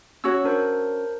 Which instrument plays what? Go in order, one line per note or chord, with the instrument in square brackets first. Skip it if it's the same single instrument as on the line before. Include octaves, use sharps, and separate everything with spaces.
[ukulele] C#4 F#4 C#5 [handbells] E6
[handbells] D4 A#4 C5